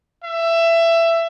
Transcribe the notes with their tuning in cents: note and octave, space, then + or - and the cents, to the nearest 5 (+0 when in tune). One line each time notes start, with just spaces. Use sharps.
E5 +20